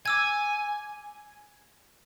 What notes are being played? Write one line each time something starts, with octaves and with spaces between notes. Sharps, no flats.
G#5 D6 E6 G#6